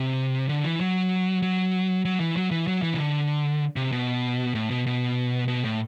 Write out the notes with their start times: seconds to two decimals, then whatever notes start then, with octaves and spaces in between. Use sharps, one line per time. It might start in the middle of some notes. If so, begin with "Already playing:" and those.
Already playing: C3
0.49 D3
0.64 E3
0.81 F#3
1.42 F#3
2.05 F#3
2.20 E3
2.37 F#3
2.51 E3
2.67 F#3
2.82 E3
2.94 C3
2.98 D3
3.76 C3
3.92 B2
4.55 A2
4.70 B2
4.86 B2
5.48 B2
5.65 A2